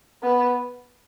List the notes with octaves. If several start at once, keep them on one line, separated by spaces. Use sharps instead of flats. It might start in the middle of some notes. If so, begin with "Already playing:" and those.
B3